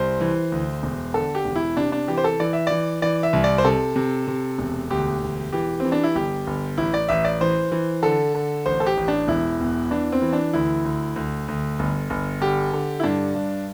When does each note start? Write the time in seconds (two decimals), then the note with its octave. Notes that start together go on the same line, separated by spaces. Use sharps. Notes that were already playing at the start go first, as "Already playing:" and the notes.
Already playing: C2 C5
0.20 E3
0.52 D2
0.83 E1
1.14 D3 A4
1.35 G4
1.45 E1
1.56 E4
1.77 C3 D4
1.92 D4
2.08 E3 G4
2.18 C5
2.24 A4
2.40 E3 D5
2.53 E5
2.67 E3 D5
3.02 E3 D5
3.23 E5
3.33 C2
3.44 D5
3.58 C5
3.65 C3 A4
3.96 C3
4.28 C3
4.59 E1
4.90 D2 G4
5.21 E1
5.52 E3 G4
5.80 E3 C4
5.92 D4
6.03 E4
6.15 G1 G4
6.47 G1
6.78 A1 E4
6.94 D5
7.09 A1 E5
7.25 D5
7.41 E3 C5
7.72 E3
8.03 D3 A4
8.35 D3
8.66 A1 C5
8.80 A4
8.86 G4
8.97 A1
9.08 D4
9.28 E1 E4
9.60 E2
9.91 E3 D4
10.12 C4
10.22 E3
10.33 D4
10.53 D2 E4
10.85 D2
11.16 D2
11.48 D2
11.79 G1
12.10 G1
12.41 D3 G4
12.73 D3
13.00 E4
13.04 G2 D4
13.35 G2